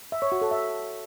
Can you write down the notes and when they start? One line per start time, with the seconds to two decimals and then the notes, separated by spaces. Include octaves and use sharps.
0.12 E5
0.22 C#5
0.32 F#4
0.41 A4
0.51 E5